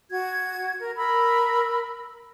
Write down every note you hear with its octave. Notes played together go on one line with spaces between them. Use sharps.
F#4 G#6
A#4
A#4 B5 E6